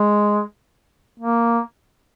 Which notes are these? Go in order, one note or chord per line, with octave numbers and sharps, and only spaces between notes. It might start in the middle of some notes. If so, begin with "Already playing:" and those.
Already playing: G#3
A#3